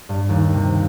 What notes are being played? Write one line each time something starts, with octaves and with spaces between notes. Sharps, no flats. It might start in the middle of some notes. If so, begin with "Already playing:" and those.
G2
D#2
C3